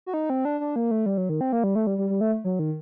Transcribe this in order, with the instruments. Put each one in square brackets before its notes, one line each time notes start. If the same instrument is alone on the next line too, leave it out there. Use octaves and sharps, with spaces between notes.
[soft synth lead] F#4
D#4
C4
D4
D4
A#3
A3
G3
F#3
D#3
C4
A#3
G3
A3
G3
G3
G3
A3
F#3
D#3